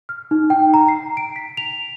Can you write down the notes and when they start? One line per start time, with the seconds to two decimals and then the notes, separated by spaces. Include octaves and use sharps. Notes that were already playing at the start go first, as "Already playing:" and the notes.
0.09 F6
0.31 D#4
0.50 G5
0.74 A#5
0.88 C7
1.17 D7
1.36 B6
1.57 F7